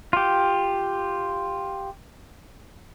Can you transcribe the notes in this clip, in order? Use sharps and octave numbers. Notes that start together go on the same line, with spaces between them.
F4 G4